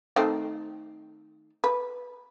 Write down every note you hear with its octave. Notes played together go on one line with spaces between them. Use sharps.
D#3 A3 C4
B4